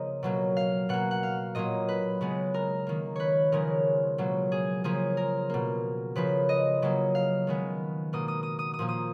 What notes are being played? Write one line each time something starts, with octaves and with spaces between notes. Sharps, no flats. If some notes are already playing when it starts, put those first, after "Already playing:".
Already playing: C#3 F3 A#3 D#5
B2 F#3 A#3
F5
B2 A#3 F#5
F#5
F5
A#2 F#3 A#3 D#5
B4
C#3 G#3 B3
A#4
D#3 A#3
B4 C#5
C#3 F3 G#3 A#4
B2 F#3 A#3
G#4
C#3 F3 A#3 G#4
A#4
B2 A#3
C#3 F3 A#3 B4
D#5
C#3 F#3 A#3
F5
D#3 G#3 B3
B2 A#3 D#6
D#6
D#6
D#6
D#6
A#2 F3 A#3
D#6